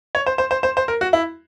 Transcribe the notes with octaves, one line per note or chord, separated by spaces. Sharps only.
C#5
C5
C5
C5
C5
C5
A#4
F#4
E4